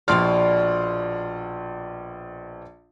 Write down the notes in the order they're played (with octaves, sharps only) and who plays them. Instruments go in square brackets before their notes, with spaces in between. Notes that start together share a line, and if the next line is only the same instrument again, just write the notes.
[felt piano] A#1 C6 F6 [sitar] B2 D5